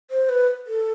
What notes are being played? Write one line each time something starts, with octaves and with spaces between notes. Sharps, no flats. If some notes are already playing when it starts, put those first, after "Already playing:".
C5
B4
A4